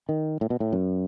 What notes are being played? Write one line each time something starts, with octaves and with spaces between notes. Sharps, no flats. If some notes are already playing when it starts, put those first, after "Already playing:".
D#3
A2
B2
A2
F#2